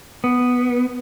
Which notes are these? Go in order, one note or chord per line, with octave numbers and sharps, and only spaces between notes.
B3